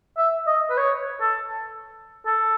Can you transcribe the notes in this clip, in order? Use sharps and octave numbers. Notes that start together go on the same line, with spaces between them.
E5
D#5
B4
C#5
A4
A4